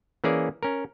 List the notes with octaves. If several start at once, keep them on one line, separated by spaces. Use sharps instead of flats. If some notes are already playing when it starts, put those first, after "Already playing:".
E3 A#3 C#4 G#4 D5
C#4 A#4